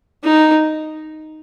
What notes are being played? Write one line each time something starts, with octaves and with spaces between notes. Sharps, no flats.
D#4